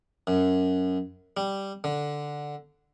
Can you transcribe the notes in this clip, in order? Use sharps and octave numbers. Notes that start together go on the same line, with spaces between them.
F#2
G3
D3